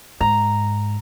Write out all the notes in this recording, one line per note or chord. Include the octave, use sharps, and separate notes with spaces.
G#2 A#5